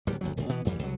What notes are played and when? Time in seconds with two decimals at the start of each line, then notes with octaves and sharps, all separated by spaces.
0.07 D1 D#2 G3
0.21 G1 D2 F#3
0.37 D#1 D2
0.49 B2 E3 B3
0.65 A1 F2 E3 G3
0.79 C2 F#3